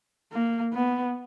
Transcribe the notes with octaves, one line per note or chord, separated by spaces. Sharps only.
A#3
B3